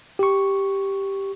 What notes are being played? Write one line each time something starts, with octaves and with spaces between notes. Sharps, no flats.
G4 C#6